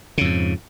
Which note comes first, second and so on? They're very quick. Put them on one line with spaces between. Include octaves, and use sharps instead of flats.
C#3 F2 G#2